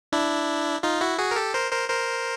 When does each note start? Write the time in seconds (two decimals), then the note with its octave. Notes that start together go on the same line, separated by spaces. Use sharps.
0.12 D4 E4
0.83 D#4 F4
1.01 E4 F#4
1.18 F#4 G#4
1.31 A#4
1.36 G4 A4
1.54 A#4 C5
1.71 A#4 C5
1.89 A#4 C5